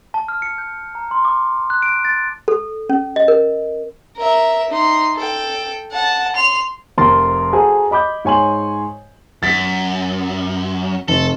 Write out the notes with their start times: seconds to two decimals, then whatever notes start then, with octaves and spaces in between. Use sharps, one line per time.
0.14 A5
0.28 F6
0.42 C#7
0.58 G6
0.95 A#5
1.11 C6
1.25 D6
1.70 F#6
1.82 D7
2.05 A6
2.48 A4
2.90 C#4
3.16 D#5
3.28 A#4
4.18 A#4 E5
4.71 D#4 C6
5.16 A4 G5
5.92 F#5 A5
6.35 C6 F7
6.98 F1 F2 A#4 C6 A6
7.53 F#4 G#4 A4 C5 A#5
7.91 D#5 B5 D6 G6
8.25 G#2 C#5 G#5 C6 F#7
9.43 F#2 A6 B6
11.08 F1 A4